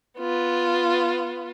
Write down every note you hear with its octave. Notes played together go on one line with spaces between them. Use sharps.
B3 F4